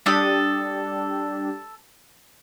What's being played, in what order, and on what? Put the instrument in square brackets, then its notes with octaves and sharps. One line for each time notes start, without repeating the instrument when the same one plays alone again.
[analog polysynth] G3 D4 G4 [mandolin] A4 D#6